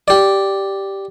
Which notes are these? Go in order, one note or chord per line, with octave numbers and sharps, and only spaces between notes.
G4 D5